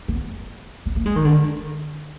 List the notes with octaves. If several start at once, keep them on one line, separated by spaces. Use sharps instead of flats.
B3
B3
A#3
G#3
D#3
D3